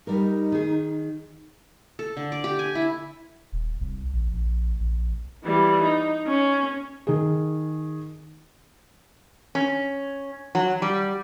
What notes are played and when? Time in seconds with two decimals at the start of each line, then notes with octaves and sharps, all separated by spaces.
0.07 G3 D#4 A#4
0.52 D#3 G#4
1.99 A4
2.17 D3
2.32 D5
2.44 G4
2.59 G#5
2.75 E4
3.52 D#1
3.81 C2
4.13 A#1
4.33 A#1
4.80 A#1
5.44 E3 G3
5.82 D#4
6.27 C#4
7.07 D#3 G#4
9.55 C#4
10.55 F#3
10.82 G3